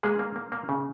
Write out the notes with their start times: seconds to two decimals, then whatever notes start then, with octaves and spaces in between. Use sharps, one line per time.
0.03 G#3 A#3 G#4
0.19 A#3
0.36 A#3
0.52 A#3
0.69 C#3